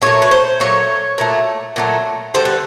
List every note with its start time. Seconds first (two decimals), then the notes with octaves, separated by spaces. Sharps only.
0.02 A#2 F#3 A3 C#5
0.22 B4
0.31 C5
0.60 A#2 F#3 A3 C#5
1.18 A#2 F#3 A3
1.76 A#2 F#3 A3
2.34 D3 G3 C5
2.45 B4